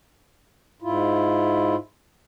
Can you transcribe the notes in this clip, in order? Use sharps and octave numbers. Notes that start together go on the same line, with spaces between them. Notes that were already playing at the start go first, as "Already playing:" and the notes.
G#2 E4 F4